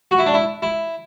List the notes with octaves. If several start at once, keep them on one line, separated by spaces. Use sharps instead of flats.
F#4
E4
D4
E4
E4